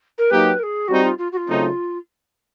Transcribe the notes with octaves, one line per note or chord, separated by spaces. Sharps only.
A#4
F#3 A#3 D#4 G4 B4
A#4
G#4
G3 C4 D#4 F#4
F4
F4
F#4
F4
C#3 F#3 A3 C4 D#4